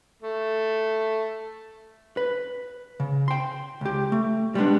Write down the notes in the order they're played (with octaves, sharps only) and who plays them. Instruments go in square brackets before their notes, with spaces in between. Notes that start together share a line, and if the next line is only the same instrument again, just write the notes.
[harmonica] A3
[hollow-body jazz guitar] B4
C#3
G5 C6
C#2 G4
A3
G3 G#3 B3 D4